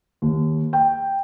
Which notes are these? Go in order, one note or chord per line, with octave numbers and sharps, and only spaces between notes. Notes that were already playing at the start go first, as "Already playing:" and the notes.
D#2
G5